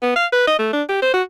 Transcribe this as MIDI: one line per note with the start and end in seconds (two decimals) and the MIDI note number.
0.03 0.15 59
0.16 0.26 77
0.32 0.47 71
0.47 0.57 75
0.59 0.68 57
0.73 0.83 62
0.89 0.98 67
1.02 1.12 72
1.14 1.22 66